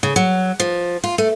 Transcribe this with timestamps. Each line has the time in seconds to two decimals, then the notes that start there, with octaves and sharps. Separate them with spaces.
0.03 C#3
0.16 F#3
0.60 F3
1.04 F4
1.18 A3